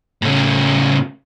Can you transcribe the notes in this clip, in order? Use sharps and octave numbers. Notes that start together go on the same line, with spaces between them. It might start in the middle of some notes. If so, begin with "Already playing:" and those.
A2 C#3